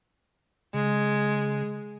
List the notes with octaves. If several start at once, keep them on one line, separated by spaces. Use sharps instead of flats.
C#3 G#3